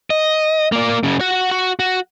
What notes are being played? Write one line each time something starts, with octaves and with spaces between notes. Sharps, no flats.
D#5
A#3 D5
F#2 C#3
F#4 F#5
F#4
F#4